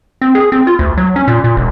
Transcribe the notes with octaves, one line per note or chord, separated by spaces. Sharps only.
C4
G#4
C4
F4
D2
F#3
C#4
A#2
A#2
E1